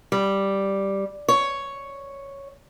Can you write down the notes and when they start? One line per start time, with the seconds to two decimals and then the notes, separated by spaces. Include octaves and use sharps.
0.12 G3
1.28 C#5